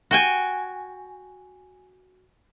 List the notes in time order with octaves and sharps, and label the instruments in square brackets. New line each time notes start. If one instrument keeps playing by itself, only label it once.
[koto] F#4 G5 G#5